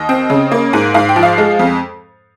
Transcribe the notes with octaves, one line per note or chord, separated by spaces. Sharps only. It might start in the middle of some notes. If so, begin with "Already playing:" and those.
Already playing: D#2 D#5
C4
C#3
A#3
G#2
G#2 F5
G5
F3
F5
G#3
F2